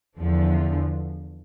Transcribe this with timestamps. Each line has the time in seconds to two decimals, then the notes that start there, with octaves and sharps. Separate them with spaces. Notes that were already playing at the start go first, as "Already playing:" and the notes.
0.18 E2 D3 F3